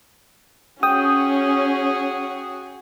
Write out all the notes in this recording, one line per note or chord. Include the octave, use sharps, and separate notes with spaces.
C#4 F#4 G#4 C#5 G5 D#6